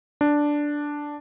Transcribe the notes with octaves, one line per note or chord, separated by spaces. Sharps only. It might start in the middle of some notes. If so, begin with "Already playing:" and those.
D4